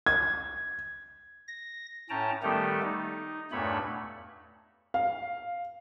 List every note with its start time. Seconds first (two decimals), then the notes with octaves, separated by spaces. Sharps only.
0.07 G#6
1.48 A#6
2.10 A2 C#4 G5 A5 A#5
2.42 D#3 G3 A3 B3 G4 A4
2.82 D#4
3.51 E2 G2 A#2 A3 C#5 B5
4.94 F5